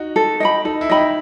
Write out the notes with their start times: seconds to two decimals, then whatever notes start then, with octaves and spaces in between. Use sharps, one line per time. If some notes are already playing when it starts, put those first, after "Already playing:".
Already playing: D#4 F#4
0.16 A4
0.40 D#5 G5 B5
0.65 D#4 A4
0.81 E4
0.89 D#4 D#5 G5 B5
0.97 E4